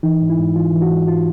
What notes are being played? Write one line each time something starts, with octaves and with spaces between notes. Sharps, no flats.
E3 D#4
G#2
E4
G#2
E3 F4
E3
F#4
G#2
F4